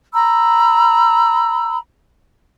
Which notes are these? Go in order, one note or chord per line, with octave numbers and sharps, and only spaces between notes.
A#5 B5 E6